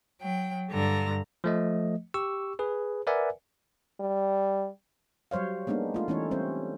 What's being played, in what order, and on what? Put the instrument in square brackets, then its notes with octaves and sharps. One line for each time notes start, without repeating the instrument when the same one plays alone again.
[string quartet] F#3 G5
G2 D3 A#5
[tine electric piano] F3 A3 D#5
G4 C#6 E6
G#4 B4
A#4 B4 D5 E5 F#5 G#5
[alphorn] G3
[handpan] F#3 G3 C5 C#5 F5
G#3 A#3 B3 D4 D#4
A3 F4
E3 A3 C#4 D#4 A4 C#5
G3 C4 C#4 C5